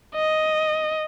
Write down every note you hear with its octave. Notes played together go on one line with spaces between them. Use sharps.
D#5